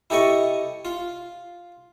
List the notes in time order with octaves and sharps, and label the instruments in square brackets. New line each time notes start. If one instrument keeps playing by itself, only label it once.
[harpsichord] E4 G4 A4 D#5 C#6
F4